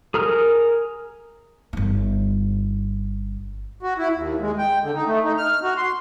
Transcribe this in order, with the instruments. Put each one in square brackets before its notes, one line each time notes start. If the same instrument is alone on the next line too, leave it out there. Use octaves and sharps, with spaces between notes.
[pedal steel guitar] G#4 A#4 A#5 F6
[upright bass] G1 D#4
[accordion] F#4
E4
D#2
G#3
G5
D3
D#4
A3
D#4
F6
F#4
C6